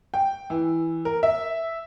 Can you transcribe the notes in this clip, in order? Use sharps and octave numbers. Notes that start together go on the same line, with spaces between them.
G5
E3
A#4
E5